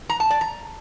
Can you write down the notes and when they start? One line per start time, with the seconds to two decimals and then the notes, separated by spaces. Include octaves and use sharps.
0.09 A#5
0.20 A5
0.30 D5
0.41 A#5